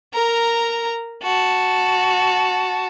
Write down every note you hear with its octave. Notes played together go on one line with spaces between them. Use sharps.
A#4 A#5
F#4 A5